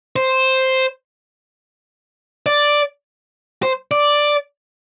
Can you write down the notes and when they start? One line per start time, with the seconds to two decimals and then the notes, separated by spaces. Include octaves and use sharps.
0.16 C5
2.46 D5
3.63 C5
3.91 D5